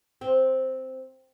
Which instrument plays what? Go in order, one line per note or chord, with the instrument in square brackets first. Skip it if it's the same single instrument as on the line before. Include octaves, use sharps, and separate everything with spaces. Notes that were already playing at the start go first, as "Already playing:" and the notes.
[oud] C4